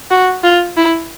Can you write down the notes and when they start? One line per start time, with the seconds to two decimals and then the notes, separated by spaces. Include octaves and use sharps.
0.11 F#4
0.44 F4
0.77 E4